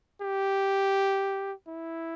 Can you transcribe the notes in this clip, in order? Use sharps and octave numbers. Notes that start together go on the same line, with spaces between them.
G4
E4